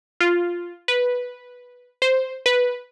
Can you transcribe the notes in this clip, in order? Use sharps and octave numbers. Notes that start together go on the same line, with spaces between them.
F4
B4
C5
B4